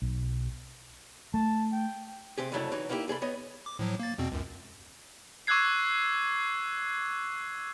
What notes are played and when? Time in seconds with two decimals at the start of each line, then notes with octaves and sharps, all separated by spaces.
0.02 B1
1.34 A3 A5
1.72 G5
2.38 C3 C4 G4 G#4
2.52 C2 F2 C#3 F#3 A3 E4
2.72 E3 F#3 D#4
2.89 A#3 B3 D#4 E4 G4
3.08 C2 G#4 A4 B5
3.22 B3 C#5 D#5
3.66 D6
3.79 A2 F3 F#3
3.99 A#3 A6
4.18 E2 B2 C4
4.32 C#2 F#2
5.47 C#6 D6 E6 F#6 G#6 C7